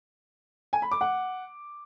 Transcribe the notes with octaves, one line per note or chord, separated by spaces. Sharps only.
G#5
B5
D6
F#5